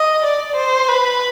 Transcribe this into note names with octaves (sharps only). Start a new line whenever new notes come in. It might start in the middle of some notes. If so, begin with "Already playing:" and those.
Already playing: D#5
D5
C5
B4